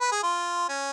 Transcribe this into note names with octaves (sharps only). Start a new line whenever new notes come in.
B4
G#4
F4
C#4